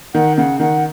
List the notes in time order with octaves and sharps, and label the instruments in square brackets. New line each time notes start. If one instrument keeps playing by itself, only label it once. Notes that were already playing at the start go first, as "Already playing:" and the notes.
[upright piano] D#3 [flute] F#5
[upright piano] C#3 [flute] F#5
[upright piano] D#3 [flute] F#5